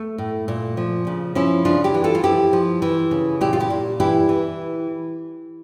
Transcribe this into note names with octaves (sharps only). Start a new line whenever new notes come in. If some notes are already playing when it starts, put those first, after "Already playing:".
Already playing: A3
A2
A#2
F3
C#3
F3 C#4 E4
C#3 D4 F4
E4 G4
E3
F4 A4
F4
F3 E4 G4
F3
E3
C#3
A#2 E4 G4
F4
E4 G4
A#2
E3 E4 G4
E3